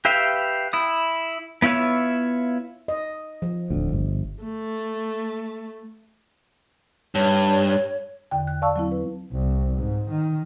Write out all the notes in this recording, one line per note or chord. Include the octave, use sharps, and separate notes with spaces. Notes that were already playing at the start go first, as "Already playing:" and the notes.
G4 B4 E5 F5 G5
E4 D#6
B3 E4 F4 C#5 E5
D#5
F3
D1 D2
G1
A3
G2 C#5
E2 D3 G5
F#6
D5 F5 A5 C#6 E6
F#3 C4 E4
B4
C2
G#2
D#3